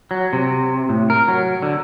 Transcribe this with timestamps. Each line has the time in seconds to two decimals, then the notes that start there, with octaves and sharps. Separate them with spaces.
0.11 F#3
0.33 C3
0.89 A2
1.10 A#4
1.28 F#3
1.62 D3